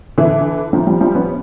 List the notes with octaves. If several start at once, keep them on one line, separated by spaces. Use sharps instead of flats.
D3 E3
D#3 F3
F3 G3
F3 G3
B3 C#4